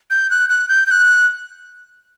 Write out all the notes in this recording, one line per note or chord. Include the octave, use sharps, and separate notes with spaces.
G6
F#6
F#6
G6
G6
F#6